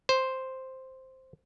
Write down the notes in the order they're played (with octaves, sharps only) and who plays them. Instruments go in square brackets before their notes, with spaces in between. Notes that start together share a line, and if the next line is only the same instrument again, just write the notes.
[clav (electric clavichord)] C5